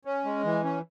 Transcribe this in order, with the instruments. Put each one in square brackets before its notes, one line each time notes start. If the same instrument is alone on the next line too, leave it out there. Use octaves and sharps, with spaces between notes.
[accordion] C#4
G#3
E3
C#4